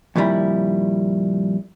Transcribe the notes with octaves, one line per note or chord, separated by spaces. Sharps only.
F2 A#2 D#3 G3 E4 B5